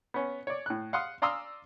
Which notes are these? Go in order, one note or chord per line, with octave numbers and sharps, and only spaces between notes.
B3 C#4
C#5 D5
A2 F#6
F5 F#5 C6 D#6
D5 F5 A#5 C6 D#6 E6